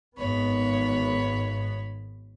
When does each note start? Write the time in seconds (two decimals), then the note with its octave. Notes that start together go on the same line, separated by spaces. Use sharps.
0.17 G#1 B3 C#5 B5